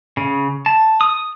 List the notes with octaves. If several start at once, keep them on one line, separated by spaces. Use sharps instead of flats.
C#3
A5
D#6